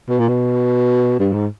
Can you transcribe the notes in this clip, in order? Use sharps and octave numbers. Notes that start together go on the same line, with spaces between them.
B2
A#2
B2
G2
G#2